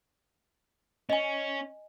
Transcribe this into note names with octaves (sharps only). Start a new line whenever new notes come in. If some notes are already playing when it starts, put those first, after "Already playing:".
C#4 D#5 G#5